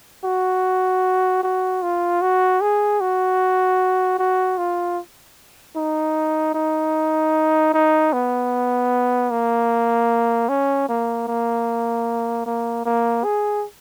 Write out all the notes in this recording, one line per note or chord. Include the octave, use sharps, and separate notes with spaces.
F#4
F#4
F4
F#4
G#4
F#4
F#4
F4
D#4
D#4
D#4
B3
A#3
C#4
A#3
A#3
A#3
A#3
G#4